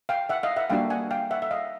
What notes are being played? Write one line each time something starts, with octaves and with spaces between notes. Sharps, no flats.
F5 G5
E5 F#5
D#5 F5
E5 F#5
G3 A#3 D4 F#4 F5 G5
F#5 G#5
F5 G5
E5 F#5
E5
D#5 F5